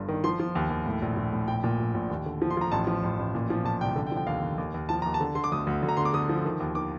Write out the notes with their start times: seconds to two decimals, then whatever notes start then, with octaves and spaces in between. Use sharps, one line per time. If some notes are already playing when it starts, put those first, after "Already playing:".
Already playing: G1 G2
0.08 D#3
0.24 F3 C6
0.40 F3
0.55 D#2
0.70 D#2
0.86 A2
1.02 A#1
1.16 A#1
1.33 A2
1.47 A#1 G5
1.64 A#2
1.79 A#1
1.94 A#1
2.10 D#2
2.26 D3
2.42 F3
2.50 C6
2.57 F3 A#5
2.72 A1 A5
2.87 F3
3.03 A1
3.19 A1
3.35 A#2
3.50 F3
3.65 A#2 A5
3.81 C2 G5
3.96 D3
4.07 G5
4.12 F3
4.17 G5
4.27 D#2 F5
4.43 D#2
4.58 D#2
4.74 D#2
4.89 F3 A5
5.02 D#2 A#5
5.14 A5
5.21 D3
5.35 D3 C6
5.44 D6
5.52 D2 D#6
5.67 D2
5.83 D2
5.89 A#5
5.97 D3 C6
6.05 D6
6.14 D3 D#6
6.29 F3
6.45 D#3
6.60 D#2
6.75 D#3 D6